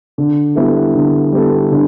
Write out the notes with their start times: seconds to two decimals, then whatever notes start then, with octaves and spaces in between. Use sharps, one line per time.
0.18 D3
0.55 G3 B3 E4 A4
0.95 D3
1.32 G3 B3 E4 A4
1.71 D3